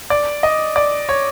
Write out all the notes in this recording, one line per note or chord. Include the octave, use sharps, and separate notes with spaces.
D5
D#5
D5
C#5